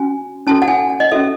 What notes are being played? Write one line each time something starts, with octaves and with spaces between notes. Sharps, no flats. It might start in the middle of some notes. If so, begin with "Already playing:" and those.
Already playing: C#4 F#4 G#5
C#4 F#4 A4 A5
F#5
G#5
F#5
D#5
C#4 F#4 A4 E5